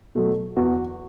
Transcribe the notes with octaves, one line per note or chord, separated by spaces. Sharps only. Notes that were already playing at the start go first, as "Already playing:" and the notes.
B2 F#3 A3
E2 F#4